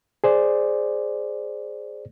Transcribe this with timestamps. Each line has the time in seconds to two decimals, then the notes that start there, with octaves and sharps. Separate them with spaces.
0.24 G#4 C5 D5